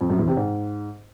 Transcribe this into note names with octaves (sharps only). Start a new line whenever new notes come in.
F2
F#2
E2
C3
G#2